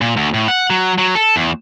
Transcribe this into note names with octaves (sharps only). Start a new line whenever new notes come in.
A#2
D2
A2
F#5
F#3
F#3
A4
E2